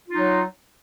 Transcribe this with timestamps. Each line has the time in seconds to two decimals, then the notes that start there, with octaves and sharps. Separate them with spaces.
0.08 F4
0.13 D#4
0.17 F#3